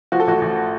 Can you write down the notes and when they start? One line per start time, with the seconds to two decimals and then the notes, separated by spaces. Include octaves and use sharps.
0.12 F3 F#4
0.20 A4
0.27 A1 F#4
0.41 A1